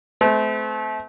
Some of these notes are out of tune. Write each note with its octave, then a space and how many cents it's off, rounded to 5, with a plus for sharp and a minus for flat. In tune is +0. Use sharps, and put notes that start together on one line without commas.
A3 -35 C4 -35